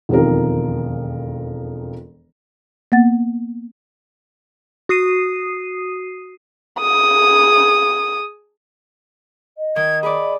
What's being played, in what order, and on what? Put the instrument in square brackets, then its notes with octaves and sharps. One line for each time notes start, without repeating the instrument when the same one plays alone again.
[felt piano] E1 F2 D#3 F3 A#4
[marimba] A#3 B3 F#5 A6
[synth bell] F#4 D#6 C7 D#7
[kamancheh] G#4 D#6
[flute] D#5
[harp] D#3 [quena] G#6
[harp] G#4 D5 [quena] B5